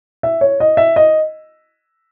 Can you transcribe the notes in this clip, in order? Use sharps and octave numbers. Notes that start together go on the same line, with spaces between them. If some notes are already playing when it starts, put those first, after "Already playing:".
E5
C#5
D#5
E5
D#5